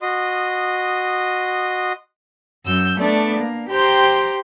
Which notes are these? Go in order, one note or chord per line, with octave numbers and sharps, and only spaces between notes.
F#4 D#5 C6 D#6
F#2 E6 G6
A3 B3 D4 D5
A#3
G4 C5 G5 A#5 C6